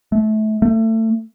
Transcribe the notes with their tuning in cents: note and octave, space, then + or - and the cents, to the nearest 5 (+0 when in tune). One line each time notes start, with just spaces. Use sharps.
A3 -25
A3 +25